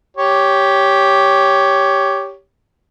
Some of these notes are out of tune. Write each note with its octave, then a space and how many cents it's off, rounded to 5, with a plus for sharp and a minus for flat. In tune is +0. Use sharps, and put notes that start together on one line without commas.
G4 +0 C#5 +10